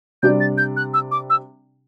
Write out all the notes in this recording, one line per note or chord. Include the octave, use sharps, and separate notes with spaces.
C3 G3 D4 G4 D5 G6
A6
G6
F#6
E6
D6
E6